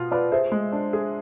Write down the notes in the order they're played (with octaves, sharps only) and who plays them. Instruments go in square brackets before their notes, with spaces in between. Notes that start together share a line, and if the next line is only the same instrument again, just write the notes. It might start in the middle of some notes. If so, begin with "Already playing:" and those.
Already playing: [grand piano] B2 B3 F4
[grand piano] F4 [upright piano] B4 D5
[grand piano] G#4 [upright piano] C5 E5
[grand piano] G#3
D4
G#4